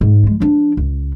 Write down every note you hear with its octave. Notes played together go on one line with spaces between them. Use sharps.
G#2
F3 G#3
F3 D4
C#2